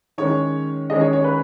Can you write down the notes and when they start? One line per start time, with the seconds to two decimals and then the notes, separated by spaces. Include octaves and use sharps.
0.18 D#3 G#3 C#4 C#5
0.89 D#3 G#3 C#4 D#5
1.01 C#5
1.13 C#5
1.24 B4